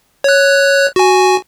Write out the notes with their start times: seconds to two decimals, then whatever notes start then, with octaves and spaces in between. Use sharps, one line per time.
0.24 C#5 F#6
0.96 F#4 G#5